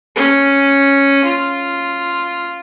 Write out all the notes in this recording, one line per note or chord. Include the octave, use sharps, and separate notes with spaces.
C#4
F4